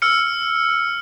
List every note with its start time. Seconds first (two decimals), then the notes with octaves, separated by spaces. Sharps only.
0.02 E6 F6 C#7